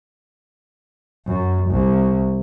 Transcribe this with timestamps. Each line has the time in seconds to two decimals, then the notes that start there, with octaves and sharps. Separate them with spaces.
1.26 F#2
1.70 C2